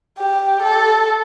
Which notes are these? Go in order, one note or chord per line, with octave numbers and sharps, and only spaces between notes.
G4
A4